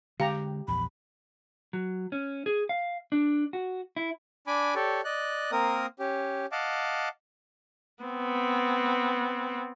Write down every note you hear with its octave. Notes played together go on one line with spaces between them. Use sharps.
D3 G#3 G4 F5 A#5
A#1 E2 B5
F#3
C#4
G#4
F5
D4
F#4
E4
D4 G#5 B5 D6
G4 A4 C#5 D5
D5 D#5 F#6
A#3 C4 A#4 D#6
C#4 G4
D#5 F5 F#5 A5 D6
B3 C4